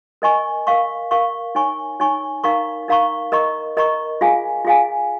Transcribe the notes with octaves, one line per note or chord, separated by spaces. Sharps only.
A#4 D#5 G#5 C#6
A#4 F5 C#6
A#4 F5 C#6
D#4 C#5 G#5 C#6
D#4 C#5 G#5 C#6
D#4 A#4 F5 A#5 C#6
D#4 A#4 F5 A#5 C#6
A#4 D#5 A#5 C#6
A#4 D#5 A#5 C#6
F4 G#4 F5 G#5
F4 G#4 F5 G#5